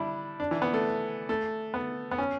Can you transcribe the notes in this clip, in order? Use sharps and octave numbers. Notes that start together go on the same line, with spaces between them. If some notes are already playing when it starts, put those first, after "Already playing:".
Already playing: G3 D4 E4
D4
E3
B3
A3
A3
B3
B3
C#4